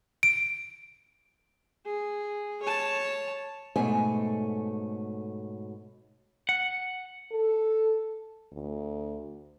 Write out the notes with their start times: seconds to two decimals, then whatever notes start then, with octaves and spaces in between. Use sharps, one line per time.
0.23 D7
1.86 G#4
2.62 C#5 A5
3.76 G#2 B2 A3 C#5 G#5
6.49 F#5
7.32 A4
8.52 D2